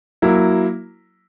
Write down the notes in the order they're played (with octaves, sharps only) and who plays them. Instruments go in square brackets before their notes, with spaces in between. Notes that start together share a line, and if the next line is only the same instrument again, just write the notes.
[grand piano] F#3 A#3 E4